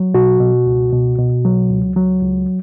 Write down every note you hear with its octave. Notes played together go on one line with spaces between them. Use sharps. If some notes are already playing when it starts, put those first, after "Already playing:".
Already playing: F#3
B2 F#4
B2
C#2
B2
B2
F#3
C#2
F#3
C#2